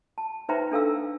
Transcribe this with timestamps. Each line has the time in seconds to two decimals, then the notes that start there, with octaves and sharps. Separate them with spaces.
0.18 A5
0.49 D#4 B4 C5 E5 G5 A#5
0.71 D4 A4 F5 E6